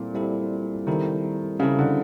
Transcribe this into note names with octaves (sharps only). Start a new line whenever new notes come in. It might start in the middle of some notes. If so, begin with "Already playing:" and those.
Already playing: A#2 G3 C4 E4 A4
G3 C4 E4 A4
D#3 G3 C4 E4 A4
C#3 G3 C4 E4 A4
D3